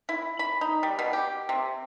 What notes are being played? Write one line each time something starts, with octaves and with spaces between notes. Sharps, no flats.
E4
B5
D#4
G3
B2
G4
C3